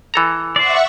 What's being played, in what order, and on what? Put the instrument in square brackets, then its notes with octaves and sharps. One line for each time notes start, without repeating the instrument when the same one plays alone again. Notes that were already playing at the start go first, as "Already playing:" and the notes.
[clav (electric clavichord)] E3 A4 A#5
[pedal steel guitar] C5 D5 [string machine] E5 F#5 C#6